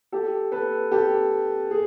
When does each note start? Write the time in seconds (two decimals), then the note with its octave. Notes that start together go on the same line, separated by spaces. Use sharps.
0.12 G4 A4
0.52 A4 B4
0.92 G4 A4
1.71 G#4